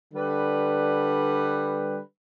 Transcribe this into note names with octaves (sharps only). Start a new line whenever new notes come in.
D3 G3 B4